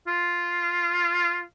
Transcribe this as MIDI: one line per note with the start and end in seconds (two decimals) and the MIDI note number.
0.07 1.43 65